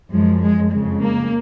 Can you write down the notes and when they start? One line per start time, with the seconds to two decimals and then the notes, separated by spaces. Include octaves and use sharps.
0.11 F#2 F3 G#3
0.41 G#3
0.70 F2 C#3 G#3
1.01 A#3